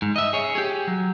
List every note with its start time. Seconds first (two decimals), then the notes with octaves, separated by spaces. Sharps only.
0.02 G#2
0.16 D#5 E5
0.33 G#4 C#5
0.55 G4 G#4
0.88 F#3